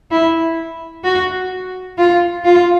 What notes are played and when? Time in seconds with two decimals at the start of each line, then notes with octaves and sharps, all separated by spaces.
0.11 E4
1.05 F#4
1.98 F4
2.45 F4